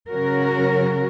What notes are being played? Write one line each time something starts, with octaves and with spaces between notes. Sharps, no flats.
C#3 F#3 C#4 F#4 A#4